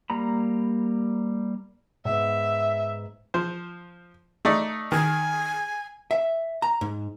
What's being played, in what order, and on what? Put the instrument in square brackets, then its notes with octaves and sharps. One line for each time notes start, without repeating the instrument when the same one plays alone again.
[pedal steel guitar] G3 A#3 A#5 B5
[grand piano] G#2 B3 [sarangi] E5
[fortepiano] F3 C5
A3 D#4 D5
[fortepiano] D#3 [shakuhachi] G#5
[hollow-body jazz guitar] E5
A#5
G#2